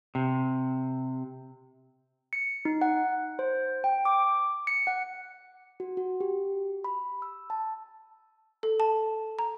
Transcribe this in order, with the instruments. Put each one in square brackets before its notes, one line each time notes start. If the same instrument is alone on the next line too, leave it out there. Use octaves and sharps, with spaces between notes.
[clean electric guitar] C3
[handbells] C#7
D#4
F#5
C5
G5
D6
C#7
F#5
[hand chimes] F#4
F#4
G4
B5
E6
A5
[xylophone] A4
A5
A#5